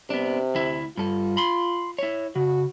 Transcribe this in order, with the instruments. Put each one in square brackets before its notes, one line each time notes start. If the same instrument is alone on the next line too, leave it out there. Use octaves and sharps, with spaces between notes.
[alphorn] C3 [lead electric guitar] B3 D4
[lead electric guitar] D2 E4
[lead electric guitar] G2 A4 [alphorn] F4
[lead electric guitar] B5 C6
E4 C#5
[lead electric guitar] C#3 [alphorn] F#4